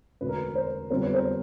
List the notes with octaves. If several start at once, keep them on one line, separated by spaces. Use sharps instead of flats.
E1 D2 D3 B4
A#4
B4
A#4 C5
F2 D3 G3 B3 A#4 C5
B4 C#5
A#4 C5